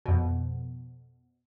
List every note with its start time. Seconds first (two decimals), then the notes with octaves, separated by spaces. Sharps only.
0.06 F2 B2